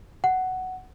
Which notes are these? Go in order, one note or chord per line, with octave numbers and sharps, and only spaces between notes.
F#5